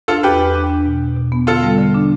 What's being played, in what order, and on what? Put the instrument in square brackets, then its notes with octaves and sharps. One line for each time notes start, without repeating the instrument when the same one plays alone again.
[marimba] D4 [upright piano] F4 A4
[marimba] E2 [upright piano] G4 B4
[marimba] E2
D4
D4
B2
B2
B2
B3
[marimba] D3 [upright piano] F4 A4
[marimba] G3
D3
D4